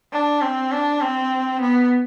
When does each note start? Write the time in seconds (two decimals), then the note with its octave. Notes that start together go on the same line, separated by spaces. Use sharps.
0.12 D4
0.42 C4
0.71 D4
1.01 C4
1.61 B3